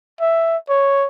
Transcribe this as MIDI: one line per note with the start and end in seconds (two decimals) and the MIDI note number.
0.21 0.57 76
0.69 1.07 73